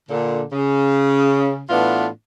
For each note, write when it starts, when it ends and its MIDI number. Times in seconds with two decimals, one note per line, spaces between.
0.10 0.42 46
0.10 0.42 50
0.53 1.62 49
1.70 2.08 45
1.70 2.08 52
1.70 2.08 59
1.70 2.08 62
1.70 2.08 65